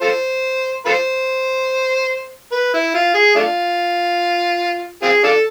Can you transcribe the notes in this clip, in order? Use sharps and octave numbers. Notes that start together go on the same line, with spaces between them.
F4 A4 C5
F4 A4 C5
B4
E4
F4
G#4
A3 D4 F4
C4 F4 G#4
D4 F4 A4